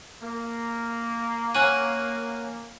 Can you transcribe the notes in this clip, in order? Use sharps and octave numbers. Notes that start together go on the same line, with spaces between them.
A#3
C#4 F#5 G#5 D#7